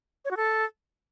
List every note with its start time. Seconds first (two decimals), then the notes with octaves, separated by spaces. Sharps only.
0.25 C#5
0.31 F#4
0.37 A4